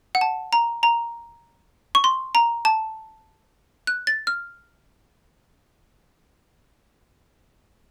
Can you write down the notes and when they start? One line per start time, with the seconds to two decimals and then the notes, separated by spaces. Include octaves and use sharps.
0.15 F#5
0.21 A5
0.53 A#5
0.83 A#5
1.95 C#6
2.04 C6
2.35 A#5
2.65 A5
3.87 F#6
4.07 A6
4.27 F6